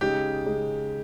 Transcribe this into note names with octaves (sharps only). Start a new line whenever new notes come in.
C#3 G#3 D#4 G4
C#3 G#3 D#4